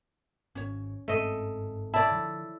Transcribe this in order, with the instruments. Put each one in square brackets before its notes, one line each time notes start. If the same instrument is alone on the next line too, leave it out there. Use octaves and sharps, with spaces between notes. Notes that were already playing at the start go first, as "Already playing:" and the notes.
[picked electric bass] G#1 [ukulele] C#4 C#5
[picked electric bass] G1 G#2 C4 [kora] A3 D#5
[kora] E4 D5 [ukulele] C#5 E5 A5
[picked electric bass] D3 F3